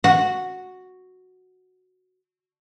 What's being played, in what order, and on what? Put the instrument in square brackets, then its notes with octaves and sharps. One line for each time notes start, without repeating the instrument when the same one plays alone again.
[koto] F#4 F#5